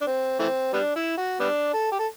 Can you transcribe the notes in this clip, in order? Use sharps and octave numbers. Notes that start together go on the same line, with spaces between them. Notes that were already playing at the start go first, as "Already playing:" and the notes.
D4
C4
E3 A3 C4
G3 B3 D4
E4
F#4
G3 B3 D4
A4
G4
A4